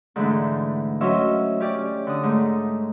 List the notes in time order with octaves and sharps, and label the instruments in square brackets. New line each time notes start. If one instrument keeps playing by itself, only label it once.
[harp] G#2 D3 E3 A3
F#3 C#4 C5 D#5 E5
C#4 G4 D5
D3 D#6
G#2 A3